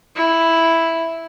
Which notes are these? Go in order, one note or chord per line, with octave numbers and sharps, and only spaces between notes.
E4